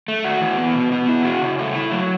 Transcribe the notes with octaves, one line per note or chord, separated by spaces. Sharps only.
A3
F#4
E3
B3
B2
B3
E4
F#4
C#3
A3
E4
F#3